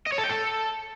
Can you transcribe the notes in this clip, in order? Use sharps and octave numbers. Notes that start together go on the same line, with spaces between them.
D#5
C#5
A4
G5
A4